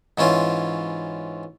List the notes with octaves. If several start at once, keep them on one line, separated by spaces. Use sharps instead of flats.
G#2 E3 C#4 F4